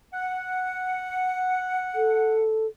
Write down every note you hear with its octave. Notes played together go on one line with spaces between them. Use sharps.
F#5
A4